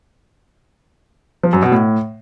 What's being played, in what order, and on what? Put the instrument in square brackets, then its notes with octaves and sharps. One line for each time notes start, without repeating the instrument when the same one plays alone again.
[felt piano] F3
F#2
B2
A2